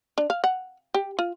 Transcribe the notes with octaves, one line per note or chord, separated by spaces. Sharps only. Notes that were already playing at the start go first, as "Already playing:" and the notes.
D4
F5
F#5
G4
F4